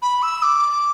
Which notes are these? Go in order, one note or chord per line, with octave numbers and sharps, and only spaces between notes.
B5
E6
D6